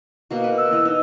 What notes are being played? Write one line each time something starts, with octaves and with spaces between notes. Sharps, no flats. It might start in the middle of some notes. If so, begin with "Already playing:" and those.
B2 A#3 F#4
B4
E6
E3 D#5
D#4